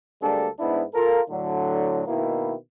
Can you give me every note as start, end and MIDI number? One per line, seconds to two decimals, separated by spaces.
0.21 0.47 38
0.21 0.47 55
0.21 0.47 56
0.21 0.47 58
0.21 0.47 62
0.21 0.47 69
0.59 0.82 44
0.59 0.82 59
0.59 0.82 62
0.59 0.82 64
0.94 1.20 65
0.94 1.20 69
0.94 1.20 70
1.29 2.02 45
1.29 2.02 50
1.29 2.02 54
2.07 2.53 47
2.07 2.53 51
2.07 2.53 58
2.07 2.53 64